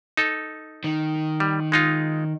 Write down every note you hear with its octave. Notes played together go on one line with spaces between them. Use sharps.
D#4 A4
D#3
G3
G#3 D#4 F4